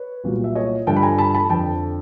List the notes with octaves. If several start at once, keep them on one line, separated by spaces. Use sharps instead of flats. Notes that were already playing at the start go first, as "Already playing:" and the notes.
Already playing: B4 C#5
C2 A#2 F#3
E5
C#5 D#5
G2 D3 F3 G5 A5
B5
G#5 A#5
A5 B5
A5 B5
F2 D3 F3 G5 A5